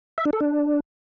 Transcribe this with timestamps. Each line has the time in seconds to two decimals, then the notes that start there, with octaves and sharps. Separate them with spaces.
0.18 E5
0.25 D4
0.33 A4
0.40 D4